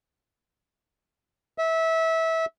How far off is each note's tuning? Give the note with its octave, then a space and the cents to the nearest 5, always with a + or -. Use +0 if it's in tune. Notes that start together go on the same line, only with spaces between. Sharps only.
E5 -20